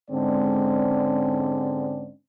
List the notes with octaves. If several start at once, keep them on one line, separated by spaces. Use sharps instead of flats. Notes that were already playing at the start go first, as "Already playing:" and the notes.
G#2 D3 G#3 C4 C#4 D5